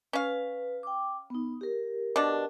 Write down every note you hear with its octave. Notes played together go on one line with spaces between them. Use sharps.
C#4 B4 F5
G5 D6
B3 D#4
G4 A#4
B2 D4